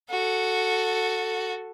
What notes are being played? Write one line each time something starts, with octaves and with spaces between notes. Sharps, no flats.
F#4 A4